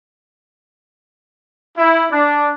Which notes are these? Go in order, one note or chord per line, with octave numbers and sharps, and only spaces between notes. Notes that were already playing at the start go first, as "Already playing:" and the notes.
E4
D4